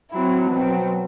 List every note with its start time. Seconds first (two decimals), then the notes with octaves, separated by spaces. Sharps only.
0.12 F#3 C4 E4
0.51 B2 F#3 C4